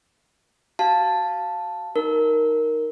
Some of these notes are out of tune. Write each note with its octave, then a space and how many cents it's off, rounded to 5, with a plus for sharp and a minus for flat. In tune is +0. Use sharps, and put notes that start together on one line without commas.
F#4 +20 F5 +0 A5 +0
D#4 +0 A#4 +0